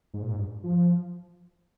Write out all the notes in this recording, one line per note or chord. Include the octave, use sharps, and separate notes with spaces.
G#2
A#2
G#2
G2
F3